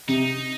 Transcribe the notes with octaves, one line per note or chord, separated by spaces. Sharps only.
C3 D#4